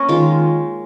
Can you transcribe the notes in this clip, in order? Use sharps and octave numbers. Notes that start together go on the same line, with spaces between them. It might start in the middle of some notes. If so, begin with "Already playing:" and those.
Already playing: A#3 C#4 A#4 C#5
D#3 G#3 F4